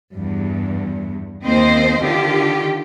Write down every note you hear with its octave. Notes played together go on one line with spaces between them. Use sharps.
E2 G2
D#2 A#3 C4 C5 D#5
D3 D#3 F4 G4